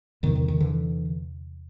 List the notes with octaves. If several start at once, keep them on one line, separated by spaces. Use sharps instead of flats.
E2 C3 D#3
D#3
D#3
D3 E3